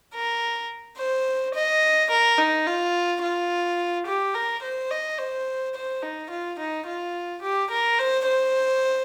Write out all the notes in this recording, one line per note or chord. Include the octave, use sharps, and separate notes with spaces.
A#4
C5
D#5
A#4
D#4
F4
F4
G4
A#4
C5
D#5
C5
C5
D#4
F4
D#4
F4
G4
A#4
C5
C5